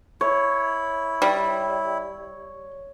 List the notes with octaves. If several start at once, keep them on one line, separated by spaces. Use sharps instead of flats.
E4 C#5
G3